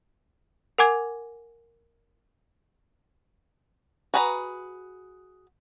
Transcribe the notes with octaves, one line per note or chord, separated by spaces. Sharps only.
A#4 F#5 G#5 D6 G#6
F#4 G#4 B4 C#5 A#5